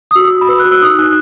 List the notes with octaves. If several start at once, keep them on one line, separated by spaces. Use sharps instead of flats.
D#6
F#4 E6
D#6
F#4
B5
B4 E6
F#6
F#4
E6
D#4 D#6
E6
D#4 F#6